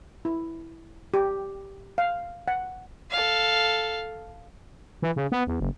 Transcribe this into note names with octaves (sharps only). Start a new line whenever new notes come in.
E4
G4
F5
F#5
A4 F5
E3
C#3
B3
E2
F#1